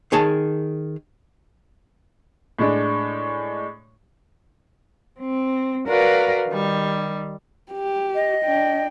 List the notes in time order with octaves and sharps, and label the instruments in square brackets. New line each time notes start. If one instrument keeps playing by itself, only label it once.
[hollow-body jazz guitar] D#3 G#4 C#5 G#5 A5
[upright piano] A2 G#3 D4
[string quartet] C4
F#4 A#4 B4 D5 F5
D#3 G3
[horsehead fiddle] G4
[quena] D#5
[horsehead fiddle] D4 G5